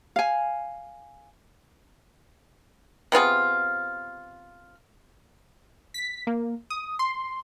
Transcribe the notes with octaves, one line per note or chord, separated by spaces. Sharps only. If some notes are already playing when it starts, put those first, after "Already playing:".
F5 G#5
C3 B3 F4 G#4
B6
A#3
D#6
C6